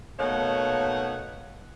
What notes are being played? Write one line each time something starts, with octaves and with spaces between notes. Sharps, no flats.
B2 A3 A#3 D#4 C#5 F#5